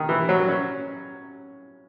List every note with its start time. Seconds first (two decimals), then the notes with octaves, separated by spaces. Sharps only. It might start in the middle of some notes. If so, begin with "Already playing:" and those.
Already playing: D#3
0.09 E3
0.29 F#3
0.48 C#4